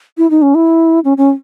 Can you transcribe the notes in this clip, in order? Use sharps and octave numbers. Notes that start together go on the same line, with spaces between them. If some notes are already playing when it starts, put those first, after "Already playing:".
E4
D#4
C#4
E4
C#4
C#4